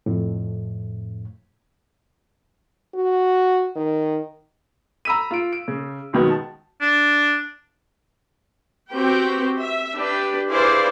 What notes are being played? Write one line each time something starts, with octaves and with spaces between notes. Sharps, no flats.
F2 A2
F#4
D#3
A#5 B5 E6 B6 D#7
F4 D7
D7
C#3
C#2 F#2 B2 D#3 G#3 B3
A5
D4
C4 F#4 G4 B4 G5
E5
D4 G4 B4
E4 G#4 B4 C5 D5 F5